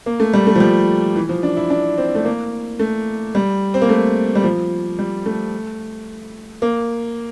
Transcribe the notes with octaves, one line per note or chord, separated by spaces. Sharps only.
A#3
A3
G3
A3
F3
G3
E3
F3
D4
E4
D4
C4
A3
A#3
A3
G3
C4
A#3
A3
G3
F3
G3
A3
A#3